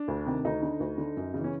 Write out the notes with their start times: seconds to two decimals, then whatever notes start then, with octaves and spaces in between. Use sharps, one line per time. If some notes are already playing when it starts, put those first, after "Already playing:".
Already playing: D4
0.08 D2
0.26 C3 D#3
0.45 D2 D#4
0.63 D3
0.80 D2
0.98 D3
1.17 F#2
1.34 C#3 E3
1.44 C#4